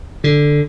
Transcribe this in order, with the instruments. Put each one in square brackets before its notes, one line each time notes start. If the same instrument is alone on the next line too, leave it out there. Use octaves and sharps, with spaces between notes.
[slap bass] D3